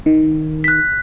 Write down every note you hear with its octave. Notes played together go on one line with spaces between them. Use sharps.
D#3
F#6 B6